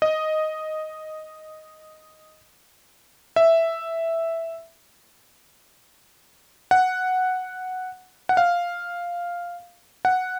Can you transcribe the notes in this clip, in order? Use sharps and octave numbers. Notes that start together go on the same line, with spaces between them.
D#5
E5
F#5
F#5
F5
F#5